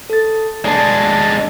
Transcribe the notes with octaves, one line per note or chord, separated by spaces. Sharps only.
A4 A6
G#3 D4 D5 A5